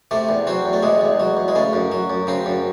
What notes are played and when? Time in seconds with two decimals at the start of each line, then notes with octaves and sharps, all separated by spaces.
0.11 C3 A3
0.29 E2
0.47 F#3 C4
0.66 E2
0.73 A3
0.83 C3 G#3
1.01 E2
1.20 F#3
1.37 E2
1.48 G#3
1.55 C#3 A3
1.73 F#2
1.92 F#3
2.10 F#2
2.27 C#3 C4
2.46 F#2